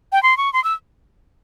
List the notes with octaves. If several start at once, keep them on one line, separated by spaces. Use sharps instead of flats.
G5
C6
C#6
C6
E6